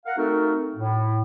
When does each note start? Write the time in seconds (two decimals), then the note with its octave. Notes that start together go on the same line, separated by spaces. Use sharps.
0.05 A#4 F5 F#5
0.17 A3 C4 D#4 F#4 A4 A#4
0.76 A2